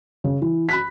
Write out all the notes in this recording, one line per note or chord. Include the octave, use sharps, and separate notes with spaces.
C#3
E3
B5 F#6 B6